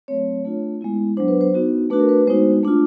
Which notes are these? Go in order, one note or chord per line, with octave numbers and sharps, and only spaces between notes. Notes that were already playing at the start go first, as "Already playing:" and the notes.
F#3 A3 C4 C#5
A3 D4 F4
G#3 B3 E4
F#3 B3 D4 C5
B4
C5
B3 D#4 F#4
A3 D4 F#4 B4
A#4
B4
G#3 B3 D#4 F#4 C5
A3 D4 F4